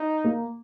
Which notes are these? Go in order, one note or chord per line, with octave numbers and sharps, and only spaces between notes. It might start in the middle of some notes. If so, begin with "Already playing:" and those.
Already playing: D#4
A#3